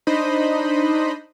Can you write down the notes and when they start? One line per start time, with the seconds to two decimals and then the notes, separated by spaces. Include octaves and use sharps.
0.07 D4 D#4 C5 D#5 B5